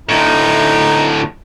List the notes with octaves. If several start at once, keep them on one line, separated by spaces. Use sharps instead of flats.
D2 A2 D#4